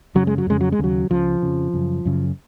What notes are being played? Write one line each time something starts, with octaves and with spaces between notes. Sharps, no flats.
F#2 C#3 F#3
G#3
F#3
F2 C#3 G#3
F#3
G#3
D#2 C#3 F#3
C#2 C#3 F3
F2 C#3
F#2 C#3
F#2 C#3